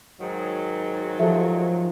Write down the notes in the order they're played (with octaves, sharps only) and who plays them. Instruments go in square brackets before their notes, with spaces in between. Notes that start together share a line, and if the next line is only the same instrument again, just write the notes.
[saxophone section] G#2 D#3 F#3
[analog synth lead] F3 [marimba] G4 A4 E5